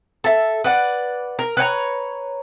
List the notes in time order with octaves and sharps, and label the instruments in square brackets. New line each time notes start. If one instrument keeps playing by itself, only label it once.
[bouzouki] A4 E5
B4 D5 F#5
A#4
B4 C#5 G5 A#5